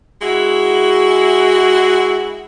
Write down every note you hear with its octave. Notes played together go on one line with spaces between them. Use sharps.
G#3 E4 F#4